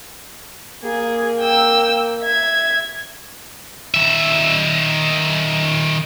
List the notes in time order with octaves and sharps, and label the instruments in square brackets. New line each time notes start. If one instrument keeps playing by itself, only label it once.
[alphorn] A#3 [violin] G#4
[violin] G5 E6
E5 G#6
[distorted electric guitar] D#3 E5